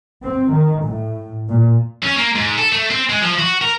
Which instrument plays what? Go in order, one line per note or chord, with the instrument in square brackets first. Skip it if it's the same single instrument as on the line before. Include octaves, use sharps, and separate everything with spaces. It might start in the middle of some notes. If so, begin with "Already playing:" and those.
[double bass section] C4
D#3
A2
A#2
[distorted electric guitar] C#4
A#3
G#2
A4
A3
C4
G#3
F3
F#4
A#4